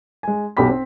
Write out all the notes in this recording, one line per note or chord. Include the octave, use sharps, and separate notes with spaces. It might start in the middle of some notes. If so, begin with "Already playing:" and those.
G#3 G#5
B1 B2 G4 B5 B6
C4